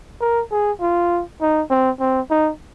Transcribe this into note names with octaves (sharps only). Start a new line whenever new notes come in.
A#4
G#4
F4
D#4
C4
C4
D#4